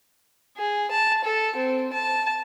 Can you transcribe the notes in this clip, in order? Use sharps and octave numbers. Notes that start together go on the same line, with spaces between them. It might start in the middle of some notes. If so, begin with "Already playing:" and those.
G#4
A5
A4
C4
A5